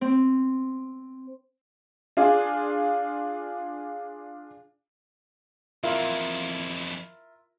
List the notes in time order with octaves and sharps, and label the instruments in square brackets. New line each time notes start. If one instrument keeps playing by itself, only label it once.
[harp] C4
[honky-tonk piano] D4 F4 G#4
[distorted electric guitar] F2 E3 [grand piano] E4 F4 A#4